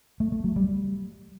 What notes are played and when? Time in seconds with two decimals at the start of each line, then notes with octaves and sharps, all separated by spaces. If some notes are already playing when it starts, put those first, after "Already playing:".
0.20 A3
0.32 A3
0.44 F#3
0.56 G3